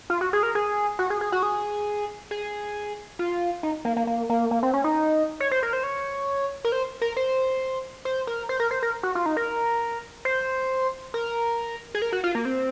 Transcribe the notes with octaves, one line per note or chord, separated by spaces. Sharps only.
F4
F#4
G#4
A#4
G#4
F#4
G#4
G#4
F#4
G#4
G#4
F4
D#4
A#3
A#3
A#3
A#3
A#3
C4
C#4
D#4
C#5
C5
A#4
C5
C#5
A#4
C5
A#4
C5
C5
A#4
C5
A#4
C5
A#4
F#4
F4
D#4
A#4
C5
A#4
G#4
A#4
F#4
F4
A#3
C4